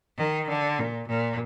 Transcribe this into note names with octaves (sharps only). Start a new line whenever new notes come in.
D#3
D3
A#2
A#2